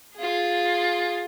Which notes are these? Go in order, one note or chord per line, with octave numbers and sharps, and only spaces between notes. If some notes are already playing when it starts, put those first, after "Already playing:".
F4 G#4